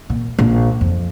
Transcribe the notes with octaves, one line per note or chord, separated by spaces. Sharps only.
A#2
A#1
F2